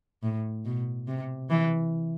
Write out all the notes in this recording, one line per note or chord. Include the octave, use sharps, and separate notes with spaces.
A2
B2
C3
E3